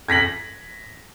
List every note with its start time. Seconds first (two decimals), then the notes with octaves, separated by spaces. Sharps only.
0.08 G#6 A#6 B6 F#7